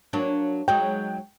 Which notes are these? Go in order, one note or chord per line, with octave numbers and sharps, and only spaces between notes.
F#3 A#3 D4
F#3 G#3 D#4 G5